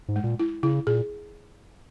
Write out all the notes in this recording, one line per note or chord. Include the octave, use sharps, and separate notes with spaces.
G#2
G#3
A#2
E4
C#3 E4
A#2 G#4